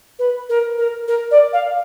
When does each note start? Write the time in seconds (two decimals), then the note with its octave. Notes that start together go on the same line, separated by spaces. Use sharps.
0.19 B4
0.49 A#4
0.78 A#4
1.08 A#4
1.31 D5
1.53 F5